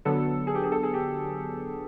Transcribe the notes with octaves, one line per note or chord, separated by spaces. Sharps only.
D3 F#3 B3 A4
G#4
G4
G#4
A4
G#4
G4